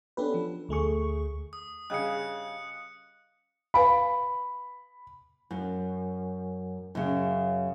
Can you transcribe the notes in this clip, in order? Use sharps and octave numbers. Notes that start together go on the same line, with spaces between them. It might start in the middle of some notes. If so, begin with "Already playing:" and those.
B3 C#4 D4 G4 A4 B4
F3
D2 A3 G#4 C#6
D#6
G2 C#3 G#4 D#5 F5 D#6 F#6 C#7
B4 F5 G#5 B5
F#2
F#2 C#3